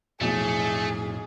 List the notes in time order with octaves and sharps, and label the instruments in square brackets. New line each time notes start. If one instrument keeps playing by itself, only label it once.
[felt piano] B1 [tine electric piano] F2 A2 [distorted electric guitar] A3 [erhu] G#4